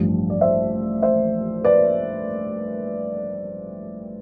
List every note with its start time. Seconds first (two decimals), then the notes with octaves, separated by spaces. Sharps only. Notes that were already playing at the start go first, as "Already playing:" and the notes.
Already playing: A1 G2 F3
0.30 D5
0.41 C5 E5
1.02 C5 E5
1.64 B4 D5